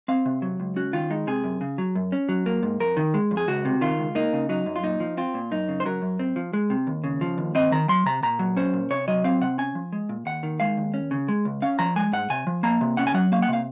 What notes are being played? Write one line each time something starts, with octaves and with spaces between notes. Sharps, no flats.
C4 F5
C3
F#3
C#2
C#4 F#4
D#3 F4
G#3 D#4
C3 G#4
F#2
C#3
F#3
F#2
C#4
F#3
A#3
G#2
F2 A#4
D#3
G#3
F2
G#4
C#2 F#4
C3
D#3 F4
C#2
A#3 D#4
C#3
F#3 D#4
F#2
F4
A#2 D#4
F3
C4 F4
A#2
F#2 D#4
C#3
C5
F#3 A#4
F#2
C4
F3
G#3
C3
D#2
C#3
F3
D#2
C4 D#5
D#3 A#5
F#3 C6
C3 A#5
A#2 A#5
F#3
C#4 C5
A#2
C3 C#5
F#3 D#5
C4 F5
C3 F#5
C#4 G#5
F3
G#3
A#2
D#2 F#5
D#3
G#3 F5
D#2
C#4
C#3
G#3
C#2
C#4 F5
F3 A#5
G#3 G#5
G#2 F#5
C3 G#5
F3
A#3 A#5
C3
C#4 F#5
G#5
F#3 F#5
A#3 F5
F#5
C3 F5